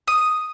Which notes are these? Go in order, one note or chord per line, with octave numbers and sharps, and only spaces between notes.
D#6